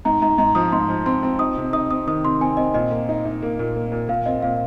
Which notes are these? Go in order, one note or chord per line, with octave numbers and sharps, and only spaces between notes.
G#2 A#5
G#2 A#5
G#2 A#5
F3 D#6
G#2 C6
F3
C4 C6
C4
D#4 D#6
C3
D#4 D#6
C4 D#6
D#3 D#6
C3 C6
C4 G#5
C4 D#5
A#2 D#5
A#3
D#4
D#4
A#3
A#2
A#3
A#2
A#2 F5
C4 D#5
A#2 F5